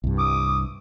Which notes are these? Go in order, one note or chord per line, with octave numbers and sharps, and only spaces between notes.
C2 G2
D6 D#6